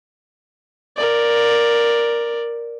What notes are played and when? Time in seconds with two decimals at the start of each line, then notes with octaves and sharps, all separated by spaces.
0.97 A#4 D5